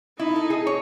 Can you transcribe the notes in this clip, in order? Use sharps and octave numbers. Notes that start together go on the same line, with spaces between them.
D#4 E4
A4
G#4
C#5